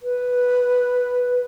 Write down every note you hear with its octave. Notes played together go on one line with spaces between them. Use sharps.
B4